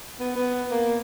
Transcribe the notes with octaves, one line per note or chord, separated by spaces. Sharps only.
B3
B3
A#3